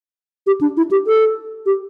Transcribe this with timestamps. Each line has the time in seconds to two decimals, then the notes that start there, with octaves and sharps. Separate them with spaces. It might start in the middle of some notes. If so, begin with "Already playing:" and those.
0.47 G4
0.61 D4
0.77 E4
0.91 G4
1.07 A4
1.66 G4